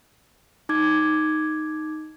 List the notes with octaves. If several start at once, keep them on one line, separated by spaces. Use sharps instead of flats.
D#4 D6 G#6